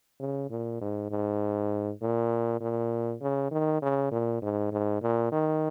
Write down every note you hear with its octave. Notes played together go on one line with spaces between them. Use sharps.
C#3
A#2
G#2
G#2
A#2
A#2
C#3
D#3
C#3
A#2
G#2
G#2
A#2
D#3